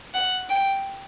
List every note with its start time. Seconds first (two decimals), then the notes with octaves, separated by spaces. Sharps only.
0.14 F#5
0.49 G5